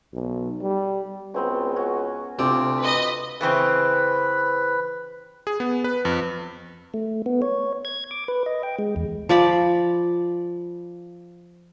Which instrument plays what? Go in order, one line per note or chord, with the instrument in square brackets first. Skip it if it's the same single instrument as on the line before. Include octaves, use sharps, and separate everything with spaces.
[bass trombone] B1
G3
[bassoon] C#2 [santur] B3 C4 F#4
[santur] C#4 F#4
[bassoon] D2 [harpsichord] C3 D5 [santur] C4 F4
[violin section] B4 D#5
[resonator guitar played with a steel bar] C#3 E3 C4 [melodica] B4
[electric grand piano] G#4
B3
B4
F2
[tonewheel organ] A3
B3
C#5
G#6
D6
B4
D#5
G5
G#3
E2
[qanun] F3 D5 B5